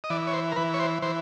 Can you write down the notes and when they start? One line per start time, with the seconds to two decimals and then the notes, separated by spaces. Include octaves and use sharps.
0.04 D#5
0.10 E3 D5
0.27 C#5
0.33 C5
0.52 A#4
0.56 E3 B4
0.74 C#5
0.80 C5
1.02 E3 C5